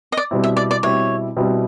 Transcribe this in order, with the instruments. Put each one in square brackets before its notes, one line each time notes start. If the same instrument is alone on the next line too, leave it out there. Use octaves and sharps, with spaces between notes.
[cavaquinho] D#5
D5
[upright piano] B2 G3 C4 E4
[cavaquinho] E5
D5
D5
[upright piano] B2 G3 C4 E4 [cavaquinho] C#5
[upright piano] B2 G3 C4 E4